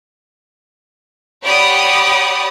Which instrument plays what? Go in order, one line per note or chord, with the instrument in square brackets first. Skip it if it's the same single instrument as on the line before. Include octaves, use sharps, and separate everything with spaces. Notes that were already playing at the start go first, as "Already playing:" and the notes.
[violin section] G4 C#5 D5 F#5 B5 D#6